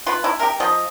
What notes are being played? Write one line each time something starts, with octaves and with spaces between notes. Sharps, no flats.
F4 B4
E4
G4 A#4
F3 D#5